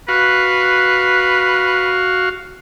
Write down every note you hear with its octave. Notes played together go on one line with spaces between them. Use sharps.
F#4 B4 F5